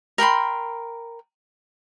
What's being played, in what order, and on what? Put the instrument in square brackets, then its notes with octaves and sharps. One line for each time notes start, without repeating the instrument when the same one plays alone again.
[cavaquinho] A#4 G5 B5 C6